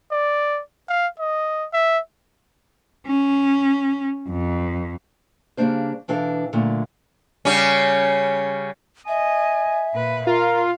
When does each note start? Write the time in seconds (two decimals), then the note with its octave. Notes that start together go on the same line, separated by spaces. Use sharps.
0.12 D5
0.89 F5
1.19 D#5
1.73 E5
3.07 C#4
4.29 F2
5.57 C#3 G3 G#3 A#3 D4 C5
6.08 B2 E3 D4 A4 F5
6.53 A#2 D3 F#3 A3
7.45 C#3 G3 C#4
9.08 D#5 E5 G#5
9.95 A#2 B4
10.27 F4 A#4 F5